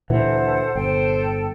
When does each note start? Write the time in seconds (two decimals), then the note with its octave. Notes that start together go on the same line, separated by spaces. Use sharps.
0.10 D2 A#2 E3 A4 C5 F#5
0.75 G1 A4 C5 G5